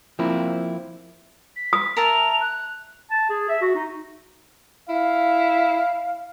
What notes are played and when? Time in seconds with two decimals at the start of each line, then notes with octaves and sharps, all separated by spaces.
0.19 F3 A#3 C4 E4
1.56 B6
1.73 D#6
1.97 A#4 E5 A5 F7
2.41 F#6
3.11 A5
3.30 G#4
3.49 E5
3.61 F#4
3.75 D#4
4.89 E4 F5